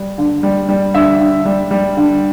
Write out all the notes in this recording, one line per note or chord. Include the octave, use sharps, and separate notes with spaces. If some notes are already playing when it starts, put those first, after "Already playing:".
Already playing: G3
D3
G3
G3
D3 E5
D3
G3
G3
D3